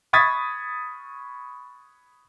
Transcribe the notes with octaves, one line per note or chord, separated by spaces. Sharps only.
B5 C#6 D#6 G#6 A6 B6